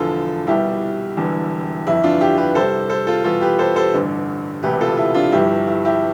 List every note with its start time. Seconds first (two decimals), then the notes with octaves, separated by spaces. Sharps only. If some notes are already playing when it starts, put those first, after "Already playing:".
Already playing: E1 E2 D3 F3 F4 A4
0.47 C2 B2 G3 E4 G4
1.17 E1 E2 D3 G3
1.86 G1 F2 E3 E4
2.03 D4 F4
2.21 E4 G4
2.38 G4 B4
2.55 C2 C3 G3 A4 C5
2.90 A4 C5
3.07 F4 A4
3.24 E2 B2 G3 F4 A4
3.41 G4 B4
3.59 A4 C5
3.76 A4 C5
3.94 A1 G2 D3
4.63 E1 D2 C3 G4 B4
4.81 F4 A4
4.97 E4
5.14 D4 F4
5.32 G1 G2 F3 E4 G4
5.67 E4
5.85 E4 G4